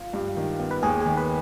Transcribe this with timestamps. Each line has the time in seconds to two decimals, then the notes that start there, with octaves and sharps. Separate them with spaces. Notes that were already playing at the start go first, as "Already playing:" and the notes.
Already playing: F4
0.13 G2
0.37 D#3
0.59 B3
0.71 B4
0.83 D#2 G#4
1.01 D#3 G#4
1.17 B4